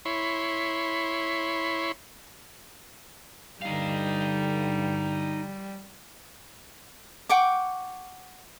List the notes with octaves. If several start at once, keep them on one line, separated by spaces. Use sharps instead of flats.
E4 C#5 B5 C6
G2 D3 G3 D#4 F5
F#5 G5 C#6 D6